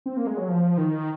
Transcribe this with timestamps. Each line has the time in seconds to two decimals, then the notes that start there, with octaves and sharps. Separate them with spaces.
0.06 C4
0.17 A#3
0.27 G#3
0.37 F#3
0.48 F3
0.78 D#3